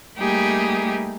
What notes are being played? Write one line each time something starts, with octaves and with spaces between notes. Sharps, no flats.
G3 A3 A#3 D#4 G4 G#4